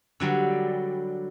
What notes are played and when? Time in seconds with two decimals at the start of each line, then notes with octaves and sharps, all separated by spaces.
0.20 D3 F#3 G3